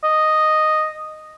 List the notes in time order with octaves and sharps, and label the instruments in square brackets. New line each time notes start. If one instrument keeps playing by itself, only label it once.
[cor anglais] D#5